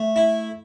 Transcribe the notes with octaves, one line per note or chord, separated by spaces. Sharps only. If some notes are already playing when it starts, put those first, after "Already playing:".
Already playing: A3
E4